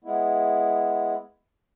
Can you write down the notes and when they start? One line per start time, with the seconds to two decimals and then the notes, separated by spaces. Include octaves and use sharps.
0.04 G#3 B3 E4